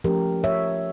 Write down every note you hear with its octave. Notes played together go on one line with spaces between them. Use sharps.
F3 A3 C#4 G4 A#4
C#5 E5